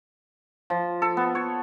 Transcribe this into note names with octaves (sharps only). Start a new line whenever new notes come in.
F3
A4
B3
C#5